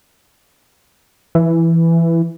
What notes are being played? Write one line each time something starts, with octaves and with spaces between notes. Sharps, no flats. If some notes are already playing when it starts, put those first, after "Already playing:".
E3